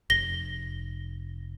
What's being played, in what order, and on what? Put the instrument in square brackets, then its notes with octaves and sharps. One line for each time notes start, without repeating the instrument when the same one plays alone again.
[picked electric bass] F1 [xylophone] A#6 G7